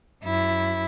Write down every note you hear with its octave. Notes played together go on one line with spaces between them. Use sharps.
F#2 E4